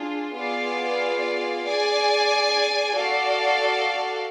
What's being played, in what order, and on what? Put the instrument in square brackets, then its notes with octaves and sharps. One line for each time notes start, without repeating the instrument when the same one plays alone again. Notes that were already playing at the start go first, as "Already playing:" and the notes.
Already playing: [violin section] D4 F4 G#4
B3 F4 G#4 D5 F5
G#4 D5 G#5
F#4 A4 D5 F5